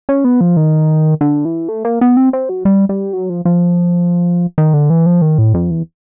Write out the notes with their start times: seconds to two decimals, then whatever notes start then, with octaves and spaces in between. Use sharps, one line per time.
0.09 C#4
0.24 B3
0.41 F3
0.57 D#3
1.21 D3
1.45 E3
1.69 A3
1.85 A#3
2.01 B3
2.17 C4
2.33 C4
2.49 F#3
2.65 G3
2.89 G3
3.13 F#3
3.30 F3
3.45 F3
4.58 D#3
4.74 D3
4.90 E3
5.06 F3
5.22 D#3
5.38 A2
5.54 F2
5.71 E2